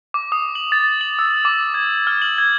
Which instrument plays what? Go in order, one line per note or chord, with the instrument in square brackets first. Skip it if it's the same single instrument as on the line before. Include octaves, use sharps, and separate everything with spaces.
[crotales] D6
D#6
F#7
A6
F#7
E6
D6
G#6
F6
F#7
G#6